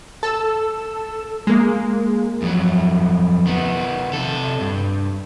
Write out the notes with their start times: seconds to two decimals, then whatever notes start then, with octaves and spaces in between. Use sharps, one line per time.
0.23 A4 E6
1.47 G#3 A#3
2.42 F2 F#3
3.47 D#3 B3
4.13 C3 A4
4.61 G2